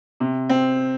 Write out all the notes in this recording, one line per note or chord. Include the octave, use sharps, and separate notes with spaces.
C3
C4